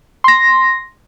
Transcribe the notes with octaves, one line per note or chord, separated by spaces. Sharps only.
C6 A#6